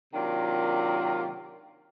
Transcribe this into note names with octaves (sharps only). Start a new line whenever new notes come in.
C3 D#3 F#3 A#3 D4 F4